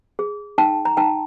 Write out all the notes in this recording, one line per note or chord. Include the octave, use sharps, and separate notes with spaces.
G#4
D#4 G5 A5
A#5
D#4 G5 A5